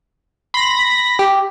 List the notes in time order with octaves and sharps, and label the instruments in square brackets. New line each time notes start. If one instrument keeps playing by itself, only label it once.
[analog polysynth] B5 A#6 [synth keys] C6
[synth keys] G4